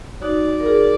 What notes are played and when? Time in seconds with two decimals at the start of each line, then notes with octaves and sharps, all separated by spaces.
0.22 D#4 F#4 D5
0.60 A#4
0.66 F4 G#4